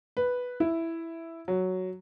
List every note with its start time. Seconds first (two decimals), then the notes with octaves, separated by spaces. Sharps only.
0.17 B4
0.60 E4
1.48 F#3